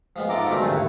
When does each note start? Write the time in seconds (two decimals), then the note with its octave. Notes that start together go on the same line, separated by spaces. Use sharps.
0.16 F3 G#3 B3
0.29 G#2 F4 A4 E5 F#5 A#5 D6
0.47 B2 D3 D#3 G#3 A3 C4
0.62 G2 D3 F3 D#4 F4 G#4 A4
0.74 D#2 A2 E4 F#5